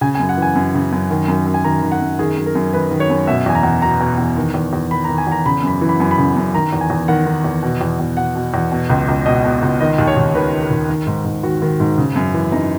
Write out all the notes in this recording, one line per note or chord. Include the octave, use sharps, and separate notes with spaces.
C#3 G#5
G#5
F#2
F#5
E3 G#5
F#2
C#3
F#2
D#3
F#2
F#2
G#5
D#3 A#5
D#3
F#5
F#2
D#3 G#4
F#2
A#4
F#2
D#3 B4
D#3
C#5
F#2
B2 E5
E2 G#5
A#5
E2
B2 A#5
B2
E2
D#3
E2
E2
D#3 B5
A#5
D#3
G#5
E2 A#5
C#3 B5
F#2 B5
E3
B5
F#2
B5
C#3
F#2
D#3 A#5
E2
G#5
E2
D#3 F#5
D#3
E2
B2
E2
E2
B2 F#5
B2
E2
B2
C#2
C#2
B2 D#5
B2
C#2
D#3 D#5
D#2
C#5
D#2
D#3 B4
D#3
A#4
D#2
D#3
G#2
G#2
D#3 F#4
D#3
G#2
C#3
F#2
E3
F#2 D#4